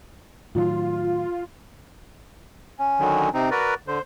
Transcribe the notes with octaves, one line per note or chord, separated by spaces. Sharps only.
A2 D#3 F#3 F4
C#4
D3 D#3 F#3
C3 C4 D#4
F#4 A#4 B4 D5
D3 C5